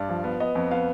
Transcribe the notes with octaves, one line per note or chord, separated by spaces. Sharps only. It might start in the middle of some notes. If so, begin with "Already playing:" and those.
Already playing: G2 D5
F3
B3
B3 D#5
F2
B3 F5